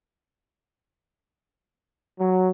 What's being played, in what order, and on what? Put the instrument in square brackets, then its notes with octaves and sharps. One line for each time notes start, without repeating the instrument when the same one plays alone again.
[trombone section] F#3